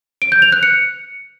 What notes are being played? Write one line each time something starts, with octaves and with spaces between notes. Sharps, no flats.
D7
G6
F7
F#6
C#7